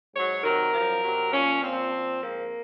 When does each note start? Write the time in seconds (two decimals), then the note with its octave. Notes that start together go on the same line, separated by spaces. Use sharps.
0.14 G#2 F#3 C#5
0.44 C3 D#3 F#3 A#4
0.73 F#2 F3
1.03 C3 F#3
1.33 A#2 F3 C#4
1.62 A#2 F3 C4
1.91 A#2 F3
2.21 G#2 F3 A#3